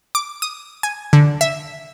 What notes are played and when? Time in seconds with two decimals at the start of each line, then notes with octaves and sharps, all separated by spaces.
0.15 D6
0.42 D#6
0.83 G#5
1.13 D3
1.41 E5